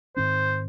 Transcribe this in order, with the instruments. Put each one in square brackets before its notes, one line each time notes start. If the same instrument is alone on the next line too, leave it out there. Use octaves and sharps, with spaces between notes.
[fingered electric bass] G#2 D#3 C4 [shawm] C5